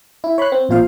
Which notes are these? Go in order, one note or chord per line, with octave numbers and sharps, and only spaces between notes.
E4
C#5 B5 C6 F#6
C4
A1 A#2 F4 C5 F5